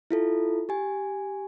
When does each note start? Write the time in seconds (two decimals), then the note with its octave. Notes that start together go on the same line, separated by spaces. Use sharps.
0.11 E4 F4 A4
0.69 G4 G#5